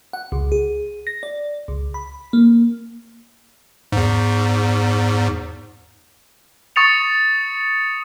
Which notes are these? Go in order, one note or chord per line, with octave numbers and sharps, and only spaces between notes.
F#5
C#2
G#4
A#6
D5
C#2
B5
A#3
E2 G#2
C#6 D#6 A6 C#7 F7